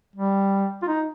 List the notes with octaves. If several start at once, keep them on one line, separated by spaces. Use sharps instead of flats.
G3
F4
D#4